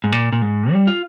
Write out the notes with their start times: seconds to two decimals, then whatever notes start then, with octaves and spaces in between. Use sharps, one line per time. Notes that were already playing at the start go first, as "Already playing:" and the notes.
0.04 G#2
0.12 A#2
0.32 A#2
0.42 G#2
0.72 G3
0.87 F4